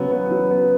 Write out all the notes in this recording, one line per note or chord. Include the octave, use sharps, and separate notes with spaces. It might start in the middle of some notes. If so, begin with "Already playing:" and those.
Already playing: C#3 F#3 B3
B3
F#3
B3